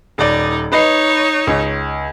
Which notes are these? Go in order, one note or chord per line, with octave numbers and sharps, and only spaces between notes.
D#1 D#4 D5
D#4 B4 C#5 D#5 C7
C#2